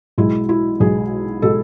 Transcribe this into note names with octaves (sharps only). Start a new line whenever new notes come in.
B1 B2 G#3 E4
E4
B1 B2 G#3 G#4
B2 G#3 A4